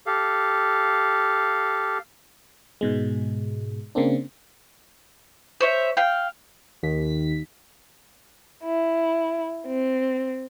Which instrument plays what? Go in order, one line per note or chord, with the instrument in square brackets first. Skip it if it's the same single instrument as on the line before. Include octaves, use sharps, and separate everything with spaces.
[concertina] G4 A4 F5
[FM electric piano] G#2 B2 G#3
C#3 A#3 C4 D4
[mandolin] C5 C#5 E5
F5 G5
[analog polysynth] D#2 B6
[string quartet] E4
C4